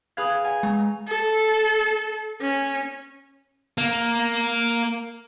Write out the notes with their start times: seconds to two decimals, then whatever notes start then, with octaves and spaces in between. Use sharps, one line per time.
0.17 G#4 B4 F5 D#6 G#6
0.45 F#5 G#5
0.63 G#3 G#5 A#5
1.08 A4
2.41 C#4
3.78 A#3